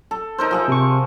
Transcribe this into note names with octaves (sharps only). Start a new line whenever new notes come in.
A4
D#4 A#4 C5
F3 G#4 E5
C3 C#6